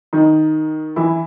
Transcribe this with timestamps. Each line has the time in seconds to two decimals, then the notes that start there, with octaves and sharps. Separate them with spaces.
0.13 D#3 D#4
0.96 E3 E4